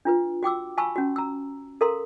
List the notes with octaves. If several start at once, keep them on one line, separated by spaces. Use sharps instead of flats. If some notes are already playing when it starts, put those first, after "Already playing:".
D4 F4 B4
F#4 G5 D6 E6
F5 G#5 A5 B5 C#6 E6
C#4 F#4
A#5 E6
A4 A#4 F5 A#5 C6